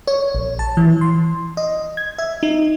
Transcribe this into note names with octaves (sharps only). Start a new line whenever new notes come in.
C#5
A#1
A5
E3
C6
D#5
G#6
E5
D#4